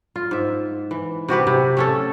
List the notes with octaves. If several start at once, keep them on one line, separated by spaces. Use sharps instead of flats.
F4
G#2 E5
E3
C3 F#4 G4 B4
C3
A3 C#4 A4